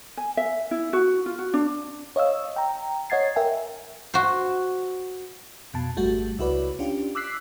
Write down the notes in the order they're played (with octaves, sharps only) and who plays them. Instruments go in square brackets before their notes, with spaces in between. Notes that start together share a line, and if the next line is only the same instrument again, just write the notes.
[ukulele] G#5
E5
E4
F#4
F4
F#4
D4
[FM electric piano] C#5 D#5 F5 E6
G5 A#5
C#5 D#5 F#5 G#6 A6 C7
A#4 E5 G5 G#5
[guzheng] F#4 C5
[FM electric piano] F2 B2 A5
G#1 G3 A3 F#4
C#2 E4 F#4 B4 D5
C#4 D4 F4 G4
D6 E6 F#6 B6 C7